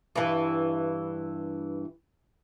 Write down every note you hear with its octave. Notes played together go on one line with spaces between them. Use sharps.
G2 E3